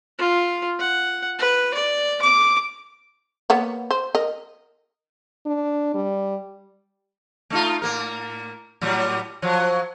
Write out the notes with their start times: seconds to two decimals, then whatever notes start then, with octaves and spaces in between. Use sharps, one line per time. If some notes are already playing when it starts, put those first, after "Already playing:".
0.19 F4
0.79 F#5
1.39 B4
1.74 D5
2.22 D6
3.50 A#3 B3 C#5
3.91 C5
4.15 A#4 D#5
5.46 D4
5.94 G3
7.50 A3 D#4 F4
7.82 A2 A#3 A#4
8.81 A2 F#3 G3
9.42 F3 F#3